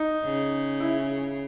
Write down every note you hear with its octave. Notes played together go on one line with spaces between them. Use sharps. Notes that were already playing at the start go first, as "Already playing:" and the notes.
Already playing: D#4
C#3
E4